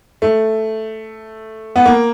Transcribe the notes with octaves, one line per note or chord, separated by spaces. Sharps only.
A3
B3
A#3